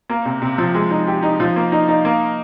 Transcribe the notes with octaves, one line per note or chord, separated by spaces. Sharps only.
A#3
C3
C3
F3
G#3
D#4
G4
D#4
F3
A#3
D#4
D#4
A#3